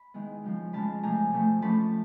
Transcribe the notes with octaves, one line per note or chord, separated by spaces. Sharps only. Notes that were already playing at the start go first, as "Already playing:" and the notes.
Already playing: B5
D#3 G#3 B3 E4
C#3 F3 G#3
C#3 F3 G#3 A5 B5
C3 F3 A3 G#5 A#5
C3 F3 A3
F3 A3 C#4 A5 B5